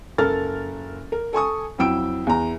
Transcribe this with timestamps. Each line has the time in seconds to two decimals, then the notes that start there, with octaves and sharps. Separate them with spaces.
0.18 F#1 A4 A#4 F6 A6
1.12 A#4
1.33 A4 G#5 C#6 D#6
1.78 F2 F#3 E4 G5 E6 D7
2.27 E2 A#5